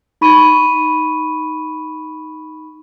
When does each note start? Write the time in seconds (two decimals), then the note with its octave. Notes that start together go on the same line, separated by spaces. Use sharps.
0.21 D#4 B5 C#6 D#7